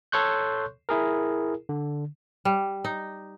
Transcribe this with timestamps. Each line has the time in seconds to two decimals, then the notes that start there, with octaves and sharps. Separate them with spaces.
0.12 A4 C#5 C6 C#6 F#6 G6
0.89 E4 G#4 A#4
1.69 D3
2.45 G3
2.84 D#4